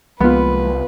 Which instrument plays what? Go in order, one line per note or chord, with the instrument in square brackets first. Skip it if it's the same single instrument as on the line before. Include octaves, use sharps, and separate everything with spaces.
[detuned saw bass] C2 [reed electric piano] F3 G#3 A#3 [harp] B3 F4 [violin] B4